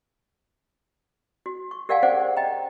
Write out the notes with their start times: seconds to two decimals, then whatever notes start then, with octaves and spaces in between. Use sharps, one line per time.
1.46 F#4
1.71 C#6
1.89 G4 A#4 D5 F5 F#5 G#5
2.03 C#4 G#4 C5 D5 F#5
2.37 D#5 G5 A#5